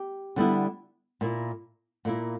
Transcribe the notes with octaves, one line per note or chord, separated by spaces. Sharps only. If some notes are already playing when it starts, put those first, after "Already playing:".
Already playing: G4
D3 G3 B3 E4
A#2 A#3 E4
A#2 A#3 E4